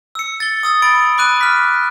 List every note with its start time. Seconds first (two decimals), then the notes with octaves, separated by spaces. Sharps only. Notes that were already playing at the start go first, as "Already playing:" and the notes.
0.15 E6 C#7
0.40 A6 G7
0.63 D#6 E6 A6
0.82 B5 A6 D7
1.18 B5 D6 F#6 D#7
1.41 F6 B6